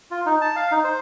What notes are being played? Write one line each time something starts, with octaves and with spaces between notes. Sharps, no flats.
F4
D#4
A5
F5
D#4
C5